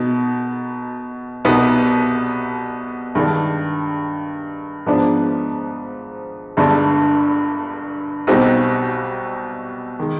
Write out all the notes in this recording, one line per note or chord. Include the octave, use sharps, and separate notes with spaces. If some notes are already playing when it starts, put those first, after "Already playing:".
Already playing: B2 B3 D#4
C2 B2 B3 D#4
G2 D#3 G#3 D4
G#2 F3 B3 D4
G1 G2 D3 G#3 D4
B1 B2 G3 C4 D#4
D#3 G#3